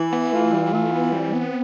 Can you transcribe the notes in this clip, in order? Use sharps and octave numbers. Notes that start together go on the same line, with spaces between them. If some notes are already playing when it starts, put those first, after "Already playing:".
Already playing: E3
B3
A3 F4
G3
G3
E3 A3
B3
G3 C4
B3